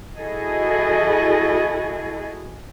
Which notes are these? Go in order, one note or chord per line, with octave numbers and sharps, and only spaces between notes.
E4 F#4 G#4 A4 D#5